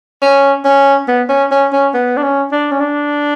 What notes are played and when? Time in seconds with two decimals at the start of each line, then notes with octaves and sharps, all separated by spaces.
0.22 C#4
0.65 C#4
1.08 B3
1.29 C#4
1.52 C#4
1.72 C#4
1.94 B3
2.17 D4
2.23 C#4
2.52 D4
2.72 C#4
2.80 D4